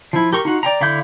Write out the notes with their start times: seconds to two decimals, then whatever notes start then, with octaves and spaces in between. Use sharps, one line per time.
0.13 F3 E4
0.33 G4 A#4 C#6
0.45 D#4 F4 F#4
0.63 D5 G5 A#5
0.81 D3 E4 F5 D6 G6